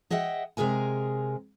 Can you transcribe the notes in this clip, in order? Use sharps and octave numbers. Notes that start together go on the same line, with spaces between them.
G#4 D#5 E5 F#5 G5
C3 G#3 G#4 A#4 G#5